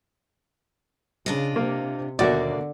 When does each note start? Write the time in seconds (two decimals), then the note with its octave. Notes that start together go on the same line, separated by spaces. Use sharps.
1.26 C#3 D4 F4 D#5
1.56 C3 A#3
2.19 D#2 B2 D3 A#3 F#4 D5 E5